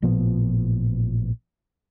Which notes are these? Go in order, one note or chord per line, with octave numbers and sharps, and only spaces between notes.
A1 A#2 F3 B3